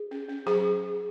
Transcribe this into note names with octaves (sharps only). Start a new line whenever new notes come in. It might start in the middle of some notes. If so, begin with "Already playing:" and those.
Already playing: G#4
C#4
C#4
F#3 G#4